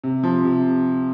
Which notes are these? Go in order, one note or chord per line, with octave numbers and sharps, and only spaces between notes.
C3
F3
C3